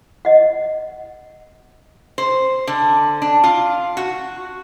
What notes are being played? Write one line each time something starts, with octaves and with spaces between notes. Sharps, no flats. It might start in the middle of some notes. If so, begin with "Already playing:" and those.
D#5 F#5
C5
D3
D4
F4
F#4